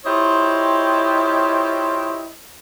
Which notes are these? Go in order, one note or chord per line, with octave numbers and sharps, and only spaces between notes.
E4 F4 G4 C5 C#5 D#5